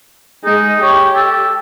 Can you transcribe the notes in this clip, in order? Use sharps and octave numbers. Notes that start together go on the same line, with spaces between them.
G#3 D#4
G4 C#5
A4